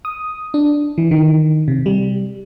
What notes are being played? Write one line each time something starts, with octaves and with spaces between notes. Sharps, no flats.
D#6
D4
E3
D#3
C3
G3